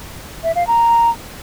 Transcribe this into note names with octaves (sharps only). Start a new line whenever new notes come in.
E5
F5
A#5